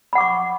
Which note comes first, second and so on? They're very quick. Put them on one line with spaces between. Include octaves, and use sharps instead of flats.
B5 F#5 D6 C#6